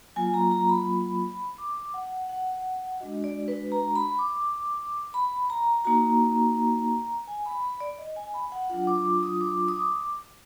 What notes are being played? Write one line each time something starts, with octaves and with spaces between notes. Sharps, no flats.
F#3 A#3 F4 G#5
A#5
A#5
B5
D6
F#5
F#5
G#3 D4 F#4 D#5
D5
B4
A#5
B5
D6
B5
A#5
A#3 D#4 F#4 A#5
G#5
B5
B5
D5
D#5
G#5
B5
F#5
F#3 D4 F4 F#5
D6
D6
D#6
D6
D#6
D6